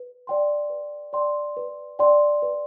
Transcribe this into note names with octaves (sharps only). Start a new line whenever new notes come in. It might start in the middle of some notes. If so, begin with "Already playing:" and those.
Already playing: B4
D5 G5 C6
B4
D5 G5 C6
B4
D5 G5 C6
B4